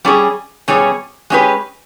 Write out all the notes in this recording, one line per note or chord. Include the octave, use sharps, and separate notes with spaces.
G3 C#4 G#4
B2 G3 C#4 G#4 C#5
G#3 C#4 G4 B4